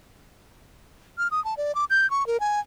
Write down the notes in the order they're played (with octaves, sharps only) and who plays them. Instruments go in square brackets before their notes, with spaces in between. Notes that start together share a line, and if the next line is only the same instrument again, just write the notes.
[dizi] F6
D#6
A5
D5
D6
G6
C#6
A#4
G#5